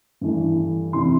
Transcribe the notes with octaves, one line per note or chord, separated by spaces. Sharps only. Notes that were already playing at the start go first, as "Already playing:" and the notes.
G2 E3 A3
E2 C3 E3 C6